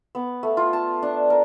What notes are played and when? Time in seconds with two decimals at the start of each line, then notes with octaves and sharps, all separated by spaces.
0.15 B3
0.43 A3
0.57 F4
0.73 A5
1.03 D4
1.30 A#4